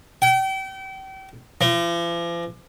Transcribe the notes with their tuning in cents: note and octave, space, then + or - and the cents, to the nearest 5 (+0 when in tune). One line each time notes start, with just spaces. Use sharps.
G5 -35
F3 -45